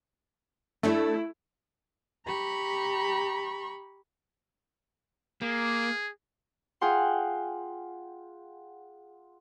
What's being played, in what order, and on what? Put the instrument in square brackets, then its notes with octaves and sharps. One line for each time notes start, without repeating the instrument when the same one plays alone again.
[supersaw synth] A3 [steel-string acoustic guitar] D4 A4 [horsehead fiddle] E4
[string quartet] G4 A#5 B5 C#6
[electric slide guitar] A#3 [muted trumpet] G#4
[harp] F4 G#4 F#5 G5 C6